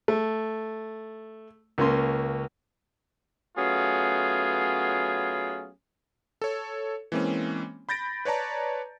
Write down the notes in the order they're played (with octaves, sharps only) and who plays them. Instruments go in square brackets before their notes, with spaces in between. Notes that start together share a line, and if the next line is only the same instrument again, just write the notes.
[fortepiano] A3
C#2 A#3 C#4 C6
[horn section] F#3 A3 B3 C#4 F4 G#4
[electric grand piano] A4 C#5
E3 G#3 A#3 C4 C#4
B5 G6 A6 A#6 D7
B4 C#5 D5 A5 A#5